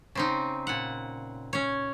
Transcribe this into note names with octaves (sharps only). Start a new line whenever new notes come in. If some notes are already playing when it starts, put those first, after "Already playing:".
C#3 C4 D#4
A#2 F#5
C#4 C#5